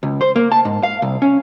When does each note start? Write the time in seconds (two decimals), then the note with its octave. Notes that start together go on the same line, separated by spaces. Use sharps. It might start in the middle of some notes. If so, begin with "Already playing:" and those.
0.03 C#2
0.21 C5
0.36 A#3
0.52 A5
0.65 G#2
0.83 F5
1.02 C2
1.22 C#4